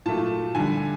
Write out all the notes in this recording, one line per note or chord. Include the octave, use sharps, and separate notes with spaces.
A#2 F#3 A3 A5
D3 G3 G#5